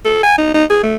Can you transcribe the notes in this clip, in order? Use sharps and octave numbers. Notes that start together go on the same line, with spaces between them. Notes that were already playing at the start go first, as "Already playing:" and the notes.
A4
G#5
D#4
D#4
G#4
A3